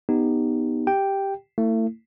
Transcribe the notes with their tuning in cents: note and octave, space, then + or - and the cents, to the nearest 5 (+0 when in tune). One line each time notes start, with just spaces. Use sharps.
B3 +0 D#4 -10 G4 +5
G4 +0 G5 +0
A3 +35 E4 +0